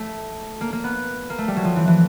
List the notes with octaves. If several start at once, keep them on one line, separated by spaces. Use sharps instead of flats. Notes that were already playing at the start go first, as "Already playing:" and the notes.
Already playing: A3
A#3
A#3
B3
A#3
A3
G3
F#3
F3
E3
E3